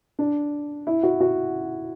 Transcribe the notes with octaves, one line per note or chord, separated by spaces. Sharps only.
D4
E4
F#4
F#4